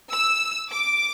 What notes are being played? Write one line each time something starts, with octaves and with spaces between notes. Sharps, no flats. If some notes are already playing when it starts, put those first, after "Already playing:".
E6
D6